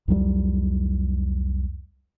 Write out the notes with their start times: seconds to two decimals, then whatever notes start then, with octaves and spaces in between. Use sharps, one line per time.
0.08 C2 F2 F#3 G3